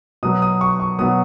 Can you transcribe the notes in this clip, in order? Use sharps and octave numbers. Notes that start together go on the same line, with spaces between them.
B2 F#3 B3 D#6
D#6
C#6
C#6
B2 F#3 B3 D#6